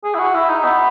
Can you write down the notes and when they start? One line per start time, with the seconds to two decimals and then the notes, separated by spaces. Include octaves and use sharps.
0.04 G#4
0.15 E4
0.19 F#4
0.34 E4
0.49 D#4
0.64 B3